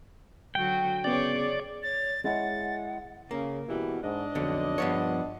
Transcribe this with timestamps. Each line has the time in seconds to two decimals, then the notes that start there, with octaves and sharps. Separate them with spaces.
0.55 D3 F#3 F#4 G5
1.04 C#3 B3 G#4 C#5 D5
1.83 C#5 A6
2.24 G#3 E4 C#5 F#5 A6
3.31 C#3 A#3
3.68 B2 E3 G3
4.03 G#2 D4 D#5
4.35 B1 F2 D3
4.78 G2 F3 B3 C#5